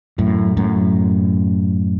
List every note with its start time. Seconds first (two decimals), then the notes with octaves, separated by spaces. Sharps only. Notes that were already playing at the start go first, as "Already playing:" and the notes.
0.18 F#2 A2
0.57 F#2 A2